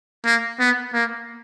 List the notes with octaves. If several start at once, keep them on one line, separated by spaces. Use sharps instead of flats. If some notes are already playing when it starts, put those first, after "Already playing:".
A#3
B3
A#3